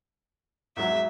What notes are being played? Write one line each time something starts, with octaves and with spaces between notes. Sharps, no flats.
E2 G#2 F#3 E5